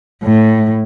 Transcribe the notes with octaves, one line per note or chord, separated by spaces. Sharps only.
A2